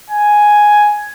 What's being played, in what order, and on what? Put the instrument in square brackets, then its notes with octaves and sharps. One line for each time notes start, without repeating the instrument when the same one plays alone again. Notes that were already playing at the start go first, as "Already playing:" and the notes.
[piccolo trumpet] G#5